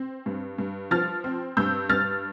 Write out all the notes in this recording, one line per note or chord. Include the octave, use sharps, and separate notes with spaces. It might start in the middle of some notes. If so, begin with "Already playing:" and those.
Already playing: C4
G2
G2
F3 F6 A6
C4
G2 E6 G6
G2 F6 A6